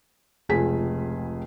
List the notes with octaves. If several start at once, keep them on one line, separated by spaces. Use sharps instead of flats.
F1 C#2 G#4 B6